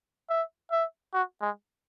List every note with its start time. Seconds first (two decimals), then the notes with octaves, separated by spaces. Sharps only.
0.29 E5
0.72 E5
1.14 F#4
1.42 G#3